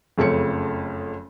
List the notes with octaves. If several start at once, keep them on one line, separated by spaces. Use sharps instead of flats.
F#1 F2 C#3 A3 C#4 C#7